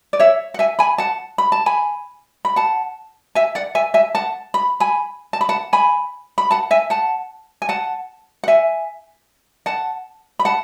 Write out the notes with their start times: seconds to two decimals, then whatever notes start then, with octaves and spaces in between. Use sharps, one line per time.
0.13 D5
0.20 C#5 E5
0.54 F#5
0.59 E5 G#5
0.79 G#5 B5
0.98 F#5 A5
1.38 B5
1.52 A5
1.66 G#5 B5
2.45 B5
2.56 F#5 A5
3.35 E5 G#5
3.55 D5 F#5
3.75 E5 G#5
3.94 E5 G#5
4.15 F#5 A5
4.54 B5
4.80 G#5 B5
5.33 A5
5.41 B5
5.49 F#5 A5
5.73 G#5 B5
6.38 B5
6.51 F#5 A5
6.71 E5 G#5
6.90 F#5 A5
7.62 G#5
7.69 F#5 A5
8.44 F#5
8.48 E5 G#5
9.66 F#5 A5
10.39 B5
10.45 F#5 A5